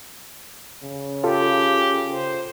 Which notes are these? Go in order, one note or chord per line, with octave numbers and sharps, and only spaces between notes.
C#3
F4 G4 A4
C5